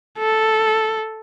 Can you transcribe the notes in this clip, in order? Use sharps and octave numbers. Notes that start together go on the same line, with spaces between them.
A4